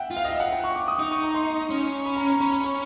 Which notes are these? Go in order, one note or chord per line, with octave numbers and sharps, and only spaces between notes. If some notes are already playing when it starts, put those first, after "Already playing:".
Already playing: E5 F#5 G5
F4
F5
D#5
E5
F#5
G5
C#6
D6
D#6
D#4
C#6
A#5
C6
C#4
B5
A#5
A#5
C#4 B5
B5
C#6